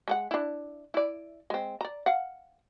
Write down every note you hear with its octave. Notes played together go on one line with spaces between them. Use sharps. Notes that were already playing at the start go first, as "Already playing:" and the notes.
G#3 A4 F#5
D4 E4
E4 D5
G#3 C4
D5 A#5
F5 F#5